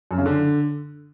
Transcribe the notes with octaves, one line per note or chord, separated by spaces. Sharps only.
F#2
C#3
D3